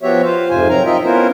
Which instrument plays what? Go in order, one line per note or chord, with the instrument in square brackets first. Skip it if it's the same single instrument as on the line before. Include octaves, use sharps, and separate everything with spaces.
[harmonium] F3 B3 F#4 G4 C#5 E5
F4 C5 F5
F2 G#2 C3 F4 C5 G#5
F#3 C4 A#4 A#5
C4 D#4 F4 A#4 D#5 E5
B3 C#4 E4 F4 A#4 C5